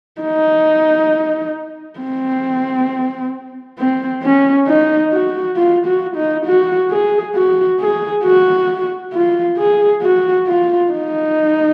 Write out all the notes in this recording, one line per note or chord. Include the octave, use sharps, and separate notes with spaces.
D#4
C4
C4
C#4
D#4
F#4
F4
F#4
D#4
F#4
G#4
F#4
G#4
F#4
F4
G#4
F#4
F4
D#4